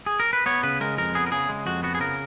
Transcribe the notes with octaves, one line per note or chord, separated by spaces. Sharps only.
G#4
A#4
B4
B3 C#5
C#3 B4
G#3 A#4
F2 A#4
B3 G#4
A#4
C#3 G#4
G#3
F2 F#4
B3 F#4
G#4
C#3 A#4